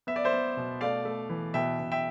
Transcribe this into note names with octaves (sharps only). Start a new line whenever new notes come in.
B3 E5
D5
C5 E5
B3
B2
A3 D5 F5
A3
E3
B2 E5 G5
B2
E5 G5